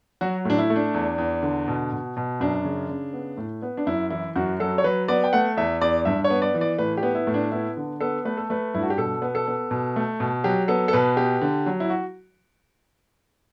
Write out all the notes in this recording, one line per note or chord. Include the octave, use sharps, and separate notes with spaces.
F#3 F#4
A2 D4
E4
A3
D4
E2
E2
D3
B2
B2
B2
F#2 D4
C#3
C#3
B3
A2
B3
D4
F#2 E4
E3 E4
F#2 F#4
F#3 A4
C#5
F#3 B4
B3 D5
G5
A3 F#5
E2 E5
E2 D5
G2 E5
C#5
B3
D5
E3
D5
A2 B4
G4
B3
E4
A2
D4
B3 E4
D3
B3 A4
A3 B4
A4
A3 B4
G2 E4
F#4
G4
B2 A4
B3
A4
B3
B2
A3
B2
F#3 G4
B3 A4
A4
B2 B4
B3 G4
D3
F#3
E4
F#4